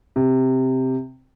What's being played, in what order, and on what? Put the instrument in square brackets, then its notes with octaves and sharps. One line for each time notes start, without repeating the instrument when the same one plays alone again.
[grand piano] C3